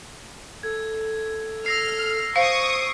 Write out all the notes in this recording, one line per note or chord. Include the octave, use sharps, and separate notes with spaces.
A4 G#6
E6 F6 A#6 C7
C5 F5 C#6 D#6 C7 D7